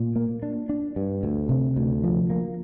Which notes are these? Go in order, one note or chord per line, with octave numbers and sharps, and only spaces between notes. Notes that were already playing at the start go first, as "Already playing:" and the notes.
Already playing: A#2
A#3
D4
D4
G2
D2
C3
D2
F3
A#3